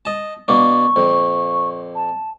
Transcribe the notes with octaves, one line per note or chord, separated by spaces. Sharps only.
D#5 A5
B2 A#3 D4 C#6
F2 A#2
A5